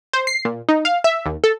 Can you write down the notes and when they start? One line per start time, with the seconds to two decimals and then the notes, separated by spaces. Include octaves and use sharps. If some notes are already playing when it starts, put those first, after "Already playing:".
0.13 C5
0.27 C7
0.45 A#2
0.69 D#4
0.85 F5
1.04 E5
1.26 D#2
1.44 A4